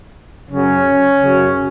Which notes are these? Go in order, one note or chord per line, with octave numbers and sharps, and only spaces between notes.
F#2 C#3 F#3 C#4
F#2 C#3 F#3